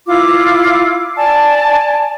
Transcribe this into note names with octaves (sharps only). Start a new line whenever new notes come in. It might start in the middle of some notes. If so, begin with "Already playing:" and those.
E4 F4 D6
D5 G#5 A5